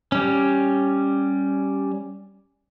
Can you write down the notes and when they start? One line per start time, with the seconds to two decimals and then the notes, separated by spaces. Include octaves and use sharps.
0.12 G3 C#4